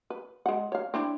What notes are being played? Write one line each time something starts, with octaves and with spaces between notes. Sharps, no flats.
B4
G#3 F#5
C#5 F5
C4 D4 E4